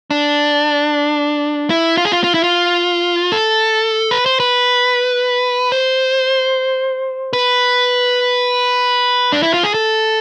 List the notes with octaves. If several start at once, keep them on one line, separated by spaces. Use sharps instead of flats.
D4
E4
F4
G#4
F4
F4
E4
F4
A4
B4
C5
B4
C5
B4
D4
E4
F4
G#4
A4